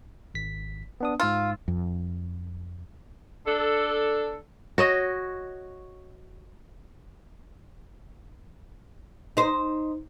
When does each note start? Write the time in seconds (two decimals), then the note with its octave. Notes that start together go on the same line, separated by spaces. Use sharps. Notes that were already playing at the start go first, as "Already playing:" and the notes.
0.34 G#1 B6
1.01 B3 D4 D#6
1.20 G#2 F4 E6
1.68 F2
3.47 D4 A4
4.78 F#4 C#5 D#5
9.37 D#4 C5